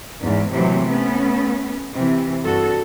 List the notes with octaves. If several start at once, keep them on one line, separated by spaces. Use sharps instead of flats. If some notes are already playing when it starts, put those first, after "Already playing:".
E2 G#2
A2 C3 E3 F#3 A#3
A3 B3 C#4
C3 E3
G2 F#4 A4